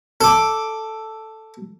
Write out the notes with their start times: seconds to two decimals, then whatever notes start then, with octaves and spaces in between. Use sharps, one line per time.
0.21 A4 D6